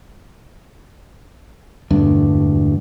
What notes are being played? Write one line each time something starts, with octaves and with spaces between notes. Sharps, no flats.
E1 D2 G2 D4